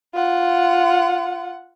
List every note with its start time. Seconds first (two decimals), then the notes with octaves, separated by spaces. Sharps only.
0.14 F4 F#5